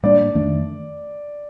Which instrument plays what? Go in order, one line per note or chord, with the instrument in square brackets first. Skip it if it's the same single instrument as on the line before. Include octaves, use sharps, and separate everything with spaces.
[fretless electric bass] A2 G3 A#3 D4 [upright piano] D5
[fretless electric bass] F2 D#3 A3 D4